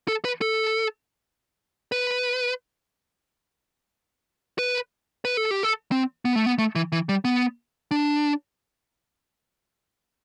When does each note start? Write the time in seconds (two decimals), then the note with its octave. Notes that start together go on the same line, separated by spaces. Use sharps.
0.08 A4
0.25 B4
0.41 A4
1.92 B4
4.59 B4
5.25 B4
5.37 A4
5.51 G4
5.63 A4
5.92 C4
6.25 B3
6.36 A3
6.46 B3
6.58 A3
6.75 E3
6.92 E3
7.09 G3
7.25 B3
7.91 D4